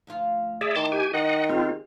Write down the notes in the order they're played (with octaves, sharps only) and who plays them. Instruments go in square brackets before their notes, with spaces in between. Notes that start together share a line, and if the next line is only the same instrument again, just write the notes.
[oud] D2 F3 F4
[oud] E4 [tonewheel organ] G#4 D5 E5
[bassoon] D#3 [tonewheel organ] A5 C6 D6
[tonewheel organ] G4 G#5
[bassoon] D#3 [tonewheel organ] D#5 F#5
[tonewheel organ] C4 F4 [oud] G4 G#4